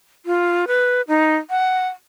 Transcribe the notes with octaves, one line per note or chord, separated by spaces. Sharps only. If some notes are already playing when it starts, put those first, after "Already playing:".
F4
B4
D#4
F#5